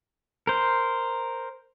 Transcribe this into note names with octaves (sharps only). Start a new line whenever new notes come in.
A#4 C5